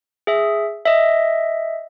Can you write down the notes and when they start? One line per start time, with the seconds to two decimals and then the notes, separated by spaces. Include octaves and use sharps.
0.27 G#4 E5
0.86 D#5 E5